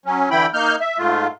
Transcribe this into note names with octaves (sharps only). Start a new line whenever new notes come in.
F#3 C#4
D3 E3 E4 G5 B5
A#3 D#4 F6 G6
E5
G#2 A3 F4